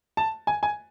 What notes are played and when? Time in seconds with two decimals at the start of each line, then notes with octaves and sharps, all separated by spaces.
0.17 A5
0.47 G#5
0.63 G#5